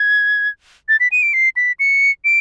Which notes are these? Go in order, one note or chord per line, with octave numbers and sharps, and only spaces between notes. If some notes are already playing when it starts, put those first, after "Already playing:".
Already playing: G#6
A6
B6
D#7
D7
C7
B6
C#7
D7